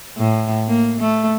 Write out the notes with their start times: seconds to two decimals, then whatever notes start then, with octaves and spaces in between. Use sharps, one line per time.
0.18 A2
0.67 A#3
1.01 A3